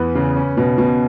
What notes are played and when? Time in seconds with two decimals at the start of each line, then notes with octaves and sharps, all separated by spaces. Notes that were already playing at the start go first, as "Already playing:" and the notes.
Already playing: E2 E3 B3 B4
0.15 C#3
0.36 C#4
0.57 B2
0.78 B2